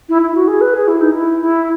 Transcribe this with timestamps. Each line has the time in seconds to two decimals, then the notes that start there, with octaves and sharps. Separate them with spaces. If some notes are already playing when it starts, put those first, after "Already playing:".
0.09 E4
0.22 E4
0.35 F#4
0.48 G#4
0.61 B4
0.74 G#4
0.88 E4
1.01 D#4
1.13 E4
1.41 E4